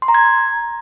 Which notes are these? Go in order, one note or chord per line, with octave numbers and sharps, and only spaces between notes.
C6
A#5
G#6